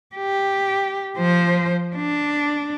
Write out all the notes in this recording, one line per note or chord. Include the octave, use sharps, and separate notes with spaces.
G4
F3 C5
D4